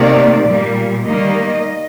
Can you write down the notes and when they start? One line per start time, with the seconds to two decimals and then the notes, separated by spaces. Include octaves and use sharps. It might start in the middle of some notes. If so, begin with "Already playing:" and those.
Already playing: C3 D#3 A#3 D5
0.47 A#2 G3 A#3
1.05 D#3 G3 A#3 D#5